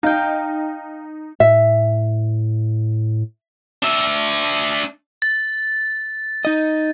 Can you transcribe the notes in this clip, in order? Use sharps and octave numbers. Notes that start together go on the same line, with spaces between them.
D#4 F5 G5
A2 E5
D4 E5
A6
D#4 D#5